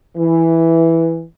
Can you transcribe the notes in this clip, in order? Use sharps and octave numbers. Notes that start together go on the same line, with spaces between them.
E3